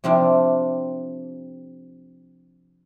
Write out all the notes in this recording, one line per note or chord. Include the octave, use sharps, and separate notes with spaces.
C3 F3 C4 D4 E4